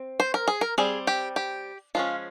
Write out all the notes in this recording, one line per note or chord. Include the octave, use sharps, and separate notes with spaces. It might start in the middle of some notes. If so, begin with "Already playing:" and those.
Already playing: C4
C5
A#4
G#4
A#4
G3 C4 G#4
G4
G4
F3 G#3 C#4 F4